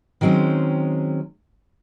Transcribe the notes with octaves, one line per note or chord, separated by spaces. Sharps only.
D#3 F#3 G#3 C4 C#4